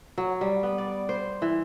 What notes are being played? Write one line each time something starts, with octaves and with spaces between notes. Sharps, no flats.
F#3
G3
B3
D5
C5
E3